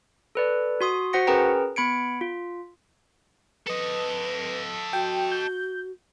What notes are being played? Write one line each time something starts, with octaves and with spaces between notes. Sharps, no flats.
A4 B4 D5
F#4 C6 D#6
F#4 C5 F#5 A#6 C#7
C#4 G#4 A#4 B4 G5 A#5
B3 B5 G#6 C#7 D7
F4
A4 B4 D#5
F#4 G5
G6